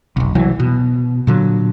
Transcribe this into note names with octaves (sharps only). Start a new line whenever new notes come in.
F1 B1
C2 E3 F#3
B2
A#2 D3 F#3